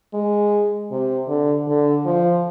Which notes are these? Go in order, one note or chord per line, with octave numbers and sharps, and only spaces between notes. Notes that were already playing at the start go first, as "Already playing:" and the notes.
G#3
C3
D3
D3
F3